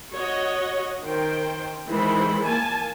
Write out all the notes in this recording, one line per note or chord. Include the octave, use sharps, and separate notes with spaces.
F#4 C#5 D#5 F#5
D#3 C5 G5
D#3 E3 G#3 C5 B5
A#3 G#5 A5